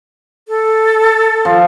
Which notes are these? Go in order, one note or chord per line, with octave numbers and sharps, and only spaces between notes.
A4
F3